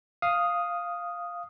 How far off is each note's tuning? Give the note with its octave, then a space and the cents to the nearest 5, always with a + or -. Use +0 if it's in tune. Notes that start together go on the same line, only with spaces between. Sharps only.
F5 +0 D#6 +0